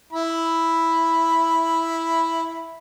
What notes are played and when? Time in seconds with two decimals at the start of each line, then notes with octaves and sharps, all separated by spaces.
0.13 E4 B5